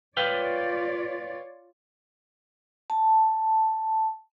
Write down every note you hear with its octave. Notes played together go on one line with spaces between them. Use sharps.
F4 B4 C#5 D5 F5 G5
A5